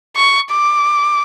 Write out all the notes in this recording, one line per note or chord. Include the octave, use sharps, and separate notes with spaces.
C#6
D6